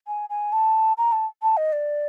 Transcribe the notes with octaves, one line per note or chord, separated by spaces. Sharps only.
G#5
G#5
A5
A#5
A5
A5
D#5
D5